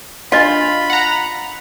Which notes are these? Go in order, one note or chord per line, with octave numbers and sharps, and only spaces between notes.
D4 F4 D#5 F5 B5
F#5 A#5